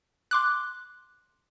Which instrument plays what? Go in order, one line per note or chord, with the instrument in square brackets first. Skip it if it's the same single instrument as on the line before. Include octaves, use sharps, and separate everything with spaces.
[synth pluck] C6 D6 F#6